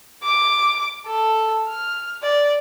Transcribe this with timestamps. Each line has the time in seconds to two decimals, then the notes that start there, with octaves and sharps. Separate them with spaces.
0.23 D6
1.07 A4
1.69 F6
2.23 D5